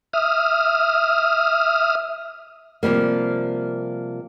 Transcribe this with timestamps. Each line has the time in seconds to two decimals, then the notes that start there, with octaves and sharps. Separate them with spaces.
0.13 E5 D#6 F6
2.83 C3 F3 G3 A#3